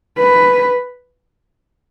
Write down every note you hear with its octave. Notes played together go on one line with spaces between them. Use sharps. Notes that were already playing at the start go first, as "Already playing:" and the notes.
B4